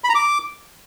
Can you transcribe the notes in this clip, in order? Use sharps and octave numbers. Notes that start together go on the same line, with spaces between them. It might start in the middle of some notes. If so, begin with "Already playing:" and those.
B5
A#5
D6